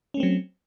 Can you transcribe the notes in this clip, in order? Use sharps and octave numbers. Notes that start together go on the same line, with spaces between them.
F#3 A3 C4 C#4